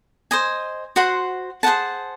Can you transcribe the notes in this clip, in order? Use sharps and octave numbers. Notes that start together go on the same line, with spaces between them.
C5 D#5 G#5
F#4 C5 F#5 C6
G#4 C5 F#5 A5